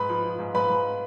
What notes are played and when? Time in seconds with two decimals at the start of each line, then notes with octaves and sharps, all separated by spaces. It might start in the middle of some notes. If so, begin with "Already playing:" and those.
Already playing: G#2 B4 B5
0.09 F3
0.24 F3
0.39 G#2
0.54 G#2 B4 B5
0.70 G#2